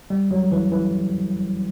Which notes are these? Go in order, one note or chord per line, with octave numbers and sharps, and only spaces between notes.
G3
F#3
E3
E3